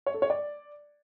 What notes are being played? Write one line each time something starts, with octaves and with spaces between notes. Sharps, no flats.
C#5
A4
C#5
D5